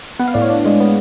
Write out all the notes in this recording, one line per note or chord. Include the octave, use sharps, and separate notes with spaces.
B3 F#5
F5
A2 D5
C#5 F5
D4
G#3
B3